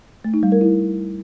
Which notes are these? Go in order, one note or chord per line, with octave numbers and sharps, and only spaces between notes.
A3
D#4
G3
A#4
E4